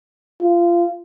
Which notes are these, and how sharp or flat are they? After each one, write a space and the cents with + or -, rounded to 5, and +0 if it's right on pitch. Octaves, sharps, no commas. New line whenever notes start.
F4 -20